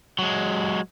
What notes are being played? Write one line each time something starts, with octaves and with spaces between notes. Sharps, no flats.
F#3 G#3